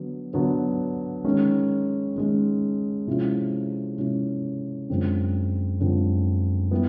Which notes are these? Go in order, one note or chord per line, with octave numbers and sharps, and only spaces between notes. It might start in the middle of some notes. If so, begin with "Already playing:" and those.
Already playing: D3 F#3 B3
D3 F#3 B3
D#3 G#3 C#4
D#3 G#3 C#4
C3 F3 G#3 C#4 E4
C3 F3 G#3 C#4 E4
F#2 D3 F3 G#3 C4
F#2 D3 F3 G#3 C4
E3 G3 B3